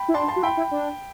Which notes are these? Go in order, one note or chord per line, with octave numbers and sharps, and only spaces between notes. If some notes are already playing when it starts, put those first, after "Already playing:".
Already playing: G5 B5
E4
D4 A5 C6
A5 C6
F#4
E4 G5 B5
E4
D4